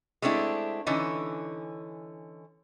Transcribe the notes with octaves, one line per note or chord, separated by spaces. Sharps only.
G#3 A3 C4 D4 E4
D3 E3 C#4 D#4